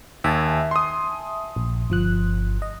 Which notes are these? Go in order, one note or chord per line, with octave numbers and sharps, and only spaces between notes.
D#2 E5 G#5 A5
C6 D#6
A#1
G1 F3 F#6
D#5